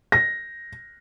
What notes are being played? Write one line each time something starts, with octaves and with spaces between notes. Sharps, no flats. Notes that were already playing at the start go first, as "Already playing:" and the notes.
A#6